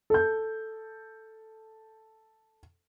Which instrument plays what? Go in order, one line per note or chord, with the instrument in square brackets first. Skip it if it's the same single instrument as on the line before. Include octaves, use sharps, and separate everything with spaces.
[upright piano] A4 G6